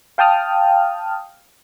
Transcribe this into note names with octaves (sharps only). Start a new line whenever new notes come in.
F5 G5 A5 D#6 F6